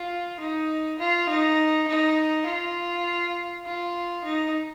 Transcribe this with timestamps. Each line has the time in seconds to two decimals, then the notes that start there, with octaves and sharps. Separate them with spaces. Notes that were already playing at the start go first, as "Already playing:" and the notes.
Already playing: F4
0.40 D#4
0.99 F4
1.29 D#4
1.88 D#4
2.46 F4
3.65 F4
4.24 D#4